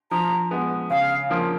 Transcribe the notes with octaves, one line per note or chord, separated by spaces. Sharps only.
F3 A#5
G#3 B3
C#3 F5
F3 A#3 F4